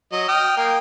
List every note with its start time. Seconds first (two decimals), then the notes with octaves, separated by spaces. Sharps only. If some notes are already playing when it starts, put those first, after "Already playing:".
0.12 F#3 D#5
0.28 G5 D#6 F6
0.57 A#3 G5